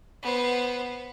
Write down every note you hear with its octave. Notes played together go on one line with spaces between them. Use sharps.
B3 C5